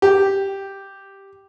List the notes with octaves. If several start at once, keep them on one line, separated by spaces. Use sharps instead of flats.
G4